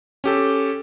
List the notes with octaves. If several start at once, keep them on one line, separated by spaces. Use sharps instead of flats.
C#4 G4 A4